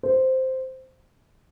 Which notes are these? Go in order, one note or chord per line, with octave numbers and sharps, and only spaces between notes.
C5